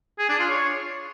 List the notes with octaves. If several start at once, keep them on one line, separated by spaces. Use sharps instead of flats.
G#4
D4
F4
C#5